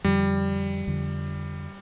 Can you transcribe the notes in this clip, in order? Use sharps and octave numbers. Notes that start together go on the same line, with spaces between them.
F2 D3 F3 G3
F2 D3 F3